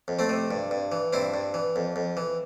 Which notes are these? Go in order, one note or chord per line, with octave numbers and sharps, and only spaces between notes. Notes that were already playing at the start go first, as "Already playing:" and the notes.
F2
A3 C4
C3
G2
G2
E3
G2 C4 E4
G2
E3
F2
F2
E3